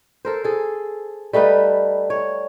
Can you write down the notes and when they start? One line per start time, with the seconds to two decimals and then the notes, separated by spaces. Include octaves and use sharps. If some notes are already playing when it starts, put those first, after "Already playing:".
0.25 A4 A#4 C5
0.44 G#4 A4
1.33 G3 A3 D#4 B4
2.10 C#5